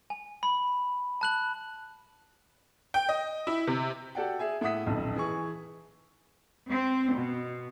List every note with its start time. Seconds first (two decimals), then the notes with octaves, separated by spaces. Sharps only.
0.10 G#5
0.43 B5
1.21 A5 F#6 F#7
2.94 G5
3.09 D#5
3.47 E4
3.67 C3
4.15 F#4 G4 A4 D5 F#5 G5
4.39 G#4 E5 G#5
4.61 A2 E5 F#5 D#6 B6
4.86 D#1 B1 F2
5.16 E3 G#4 C#6
6.70 C4
7.13 B2